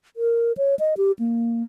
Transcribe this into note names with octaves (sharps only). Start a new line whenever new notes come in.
A#4
C#5
D#5
G4
A#3